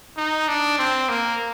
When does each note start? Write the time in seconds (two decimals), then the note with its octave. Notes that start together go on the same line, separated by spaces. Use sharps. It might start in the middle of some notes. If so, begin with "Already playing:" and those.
0.17 D#4
0.48 D4
0.79 C4
1.09 A#3